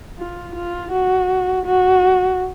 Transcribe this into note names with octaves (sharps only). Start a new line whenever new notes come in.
F4
F4
F#4
F#4